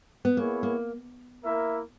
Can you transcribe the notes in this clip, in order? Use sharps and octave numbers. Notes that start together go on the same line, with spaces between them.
B3
A#3 B3 E4 G#4 C#5
A#3
A#3 E4 A#4 E5